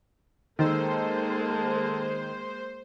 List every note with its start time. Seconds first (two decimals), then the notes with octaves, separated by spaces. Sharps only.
0.59 D#3 G#3 A#3 A4 C5